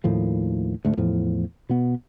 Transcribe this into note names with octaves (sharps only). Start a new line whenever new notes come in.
D#2 A2 D#3 F3
D2 G#2 A3
E2 A2 F3
B2 B3